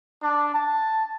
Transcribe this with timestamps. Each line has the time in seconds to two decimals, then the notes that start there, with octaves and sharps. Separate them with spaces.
0.22 D4
0.55 A5